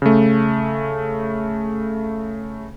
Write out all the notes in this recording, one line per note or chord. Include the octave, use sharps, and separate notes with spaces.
C#3 A3